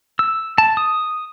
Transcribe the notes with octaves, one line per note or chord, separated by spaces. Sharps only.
E6
A5
D#6